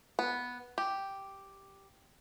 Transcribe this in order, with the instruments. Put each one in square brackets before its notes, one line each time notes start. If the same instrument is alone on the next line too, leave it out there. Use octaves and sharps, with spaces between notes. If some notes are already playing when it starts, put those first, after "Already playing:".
[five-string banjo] B3
G4